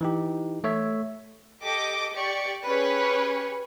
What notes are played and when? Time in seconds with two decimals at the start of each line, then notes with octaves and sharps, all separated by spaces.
0.01 E3 D#4 G4
0.64 A3 C#5 E5
1.61 G4 A4 D#5 D6
2.13 G4 D5 C#6 C#7
2.65 C#4 G4 G#4 B4 C#5